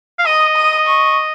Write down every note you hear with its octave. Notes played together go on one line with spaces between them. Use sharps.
F5
D#5 D#6
D#6
C#6